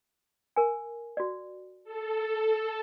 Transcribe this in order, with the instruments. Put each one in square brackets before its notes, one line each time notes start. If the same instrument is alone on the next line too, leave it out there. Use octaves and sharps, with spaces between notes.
[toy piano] A#4 G#5
F#4 D5
[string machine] A4